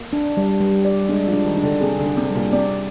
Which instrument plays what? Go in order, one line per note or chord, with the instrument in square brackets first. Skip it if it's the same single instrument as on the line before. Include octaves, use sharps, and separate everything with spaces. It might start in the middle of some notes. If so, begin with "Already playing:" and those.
Already playing: [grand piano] A#3
[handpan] D4
G3
G3
D5
[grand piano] G#3 [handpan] D4
[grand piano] F3
[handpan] D4
[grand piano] D#3
[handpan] D4
[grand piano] D3
[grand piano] C3 [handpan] G#4
[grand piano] D3
[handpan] D4
[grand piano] C3
[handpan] G3
[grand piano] A#2
[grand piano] C3 [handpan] D5